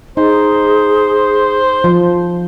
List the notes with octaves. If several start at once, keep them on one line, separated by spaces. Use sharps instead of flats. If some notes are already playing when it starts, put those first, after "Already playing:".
D#4 G#4 C5
F3